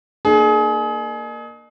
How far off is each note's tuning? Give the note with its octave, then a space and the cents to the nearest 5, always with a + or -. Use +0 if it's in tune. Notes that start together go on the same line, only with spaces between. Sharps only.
A#3 +0 D#4 -45 G#4 +30